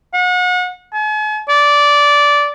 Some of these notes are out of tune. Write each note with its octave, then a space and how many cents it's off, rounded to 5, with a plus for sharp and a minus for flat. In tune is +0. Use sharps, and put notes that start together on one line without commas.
F#5 -35
G#5 +45
D5 -15